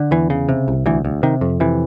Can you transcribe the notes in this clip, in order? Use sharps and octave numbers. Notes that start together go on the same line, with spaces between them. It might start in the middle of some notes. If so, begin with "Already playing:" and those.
Already playing: D3
E2 E3
C#3
C3
C2
D2 E3
D2
C3 D#3
F2
C3 E3